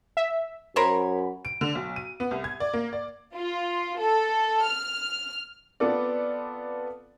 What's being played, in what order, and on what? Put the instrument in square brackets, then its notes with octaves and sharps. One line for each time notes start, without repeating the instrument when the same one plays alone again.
[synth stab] E5
[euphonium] F#2 [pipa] A#4 C5 C#5 [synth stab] B5
[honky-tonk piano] D7
D3
B1
D#7
B3
C2
G#6
D5
A#3
D5
[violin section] F4
A4
F6
[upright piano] B3 C4 F4 A4 B4 D5